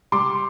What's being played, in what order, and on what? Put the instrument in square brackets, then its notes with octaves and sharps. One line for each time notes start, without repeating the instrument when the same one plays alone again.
[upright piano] G3 C6 D6